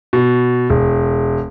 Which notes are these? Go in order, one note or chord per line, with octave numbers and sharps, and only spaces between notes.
B2
E1